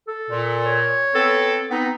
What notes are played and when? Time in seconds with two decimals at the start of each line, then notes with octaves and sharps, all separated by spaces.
0.08 A4
0.31 A#2
0.65 C#5
1.14 B3 C4 A4
1.71 B3 C4 D#4